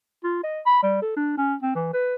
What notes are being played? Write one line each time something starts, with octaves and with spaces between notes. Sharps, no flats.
F4
D#5
B5
G3
A4
D4
C#4
C4
E3
B4